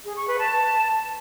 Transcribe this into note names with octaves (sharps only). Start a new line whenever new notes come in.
G#4
C#6
B4
A5